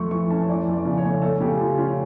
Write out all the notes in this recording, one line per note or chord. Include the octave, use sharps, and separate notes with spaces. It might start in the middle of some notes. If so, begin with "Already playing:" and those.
Already playing: F2 A3 C#6
E3 C#6
C#4 A5
E3 D5
F2
D5
C#3
C#5
A3
A3 A4
C#3 G4
F3 F4
C#4 F4